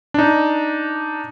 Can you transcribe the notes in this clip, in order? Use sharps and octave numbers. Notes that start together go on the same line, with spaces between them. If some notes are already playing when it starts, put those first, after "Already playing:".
D4 D#4